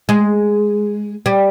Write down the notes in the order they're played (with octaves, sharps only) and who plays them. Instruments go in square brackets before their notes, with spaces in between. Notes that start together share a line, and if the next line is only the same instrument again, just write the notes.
[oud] G#3
G3